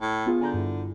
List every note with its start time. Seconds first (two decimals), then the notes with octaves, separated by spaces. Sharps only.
0.02 A2
0.26 B3 F4 G#4
0.41 D3 G#5 A#5 G6
0.54 G2 E4